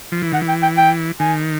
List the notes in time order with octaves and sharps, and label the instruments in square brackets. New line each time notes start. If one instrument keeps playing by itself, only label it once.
[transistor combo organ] F3
E3
[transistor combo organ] D#3 [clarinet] F#5
[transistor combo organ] E3
[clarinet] G5
G5
G5
[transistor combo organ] D#3 [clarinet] G#5